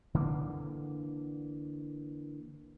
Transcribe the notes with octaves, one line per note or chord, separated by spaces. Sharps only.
D3 E3 A#3